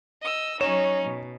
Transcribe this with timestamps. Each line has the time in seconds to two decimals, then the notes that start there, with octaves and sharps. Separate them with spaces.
0.22 D#5 E6
0.61 F#3 C#4 D#4 C#5 E7
1.05 B2